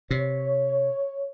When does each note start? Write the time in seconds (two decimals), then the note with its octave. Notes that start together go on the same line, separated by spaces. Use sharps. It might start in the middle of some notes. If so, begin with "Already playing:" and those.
0.11 C3 C#5